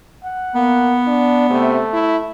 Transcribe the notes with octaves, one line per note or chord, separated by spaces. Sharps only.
F#5
A#3 B3
D4
C3 A3
E4